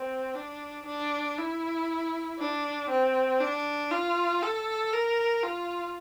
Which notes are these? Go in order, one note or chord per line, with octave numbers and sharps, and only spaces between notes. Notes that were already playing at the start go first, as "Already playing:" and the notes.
Already playing: C4
D4
D4
E4
D4
C4
D4
F4
A4
A#4
F4